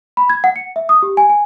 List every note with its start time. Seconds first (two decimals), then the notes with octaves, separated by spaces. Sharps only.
0.17 B5
0.30 G#6
0.44 F#5
0.56 C#7
0.76 E5
0.89 D#6
1.03 G4
1.17 G#5
1.30 G#5